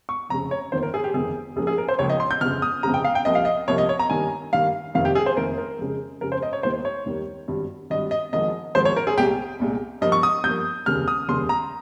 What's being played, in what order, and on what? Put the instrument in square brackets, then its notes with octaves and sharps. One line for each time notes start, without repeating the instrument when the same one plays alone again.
[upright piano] C#6
F1 F2 C#3 A#5
C#5
G1 F2 D#3 A#3 C5
A#4
G#4
G4
G1 F2 D#3 A#3 G#4
C#2 C#3 F3 A#3 G#4
G#4
A#4
C5
C#2 C#3 F3 A#3 C#5
D#5
C6
G6
G1 F2 C#3 F6
D#6
G1 F2 C#3 A#5
G5
F5
G5
C2 C3 F3 A#3 D#5
F5
D#5
C2 C3 F3 A#3 C#5
D#5
C#5
A#5
G2 D#3 A#3 G#5
G2 D#3 A#3 F5
F1 F2 C3 D#3 A#3 F5
G4
G#4
C5
F1 F2 C3 D#3 A#3 A#4
A#4
F2 C#3 G#3
F2 C#3 G#3 A#4
C5
D#5
C#5
D#2 D#3 G3 A#3 C5
C#5
D#2 D#3 G3 A#3
G#1 G2 G3
G#1 G2 G3 D#5
D#5
G#1 G#2 F3 A#3 D#5
G#1 G#2 F3 A#3 C5
C#5
A#4
G#4
C2 A#2 G#3 G4
C2 A#2 G#3
G2 F3 A#3 D#5
C#6
D#6
G2 F3 A#3 G6
F1 D#2 C#3 G3 A#3 F6
D#6
F1 D#2 C#3 G3 A#3 C6
A#5